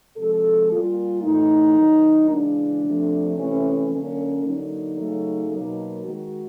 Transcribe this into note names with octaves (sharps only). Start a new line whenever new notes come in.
C3 F3 G#3 A4
A#2 G3 A#3 F4
A2 E3 A3 D#4
D#3 F#3 A#3
C#3 E3 G#3 D4
C3 F3 A3
C3 E3 A3 C#4
D3 F#3 A#3 C#4
D3 F#3 A#3 D#4
C#3 F#3 A3
B2 F#3 A#3
D#3 G#3 F#4